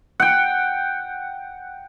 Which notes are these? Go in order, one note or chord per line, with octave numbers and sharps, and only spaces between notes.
F#5 G5